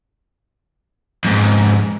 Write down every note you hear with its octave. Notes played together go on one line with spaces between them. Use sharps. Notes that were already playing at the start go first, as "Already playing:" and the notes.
F2 G#2